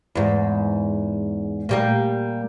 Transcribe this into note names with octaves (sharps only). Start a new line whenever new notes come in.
E2 G#2
A#2 G3 A#3